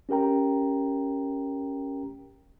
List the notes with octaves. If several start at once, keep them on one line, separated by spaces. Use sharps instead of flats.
C#4 G4 A#4 G5 A#5